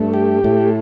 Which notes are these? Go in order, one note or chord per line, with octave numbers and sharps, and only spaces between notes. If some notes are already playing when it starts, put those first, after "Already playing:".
Already playing: G2 A3
G4
A2 A3